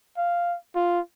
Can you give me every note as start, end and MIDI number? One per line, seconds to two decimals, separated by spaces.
0.17 0.56 77
0.76 0.99 65